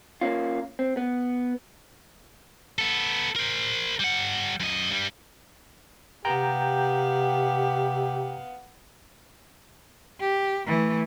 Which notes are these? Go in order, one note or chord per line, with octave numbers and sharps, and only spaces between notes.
A#3 B3 C#4 F4
C4
B3
B3 A4
A#4 C5
G3 F#5
F#2 D#5
G2 G3
C3 B3 G4 F5 G5 A#5 G6
G4
E3 A3